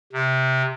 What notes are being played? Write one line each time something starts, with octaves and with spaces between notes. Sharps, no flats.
C3